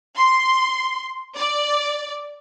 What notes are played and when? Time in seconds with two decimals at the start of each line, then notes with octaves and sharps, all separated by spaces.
0.17 C6
1.37 D5